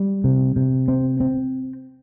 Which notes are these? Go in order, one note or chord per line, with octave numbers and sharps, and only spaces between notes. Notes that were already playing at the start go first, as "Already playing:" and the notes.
Already playing: G3
C3
C3
C4
C4